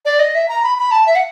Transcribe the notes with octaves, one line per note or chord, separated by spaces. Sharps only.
D5
D#5
E5
A#5
B5
B5
A5
E5
F#5